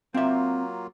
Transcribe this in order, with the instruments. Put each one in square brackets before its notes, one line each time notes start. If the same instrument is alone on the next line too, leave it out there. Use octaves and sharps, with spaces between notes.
[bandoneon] F#3 A#3 F4 [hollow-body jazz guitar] C4 E5